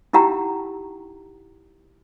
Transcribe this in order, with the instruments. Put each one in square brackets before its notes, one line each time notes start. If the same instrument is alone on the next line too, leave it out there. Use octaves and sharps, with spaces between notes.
[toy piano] D#4 E4 G4 F#5 G5 A#5